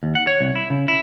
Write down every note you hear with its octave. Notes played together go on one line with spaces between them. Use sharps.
D#2
F#5
C#5
C2
E4
C#3
E4